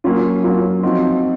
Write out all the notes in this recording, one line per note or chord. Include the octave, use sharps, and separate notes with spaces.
F#3 A#3 C#4 F4
F#3 A#3 C#4 F4
F3 C4 D#4 F#4